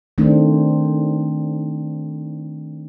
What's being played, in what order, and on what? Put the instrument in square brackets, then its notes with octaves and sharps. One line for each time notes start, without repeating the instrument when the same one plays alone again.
[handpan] D#3 A3 C4 D4